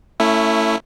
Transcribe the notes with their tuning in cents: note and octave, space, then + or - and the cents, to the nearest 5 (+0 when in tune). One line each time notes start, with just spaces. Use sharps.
A3 +25 C#4 +0 E4 +0